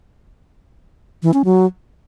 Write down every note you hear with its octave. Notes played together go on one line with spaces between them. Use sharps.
E3
C#4
F#3